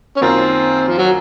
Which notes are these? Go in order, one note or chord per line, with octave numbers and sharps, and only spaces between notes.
C#4
F#2 D#3 A#3 C4 F4
F3
F#3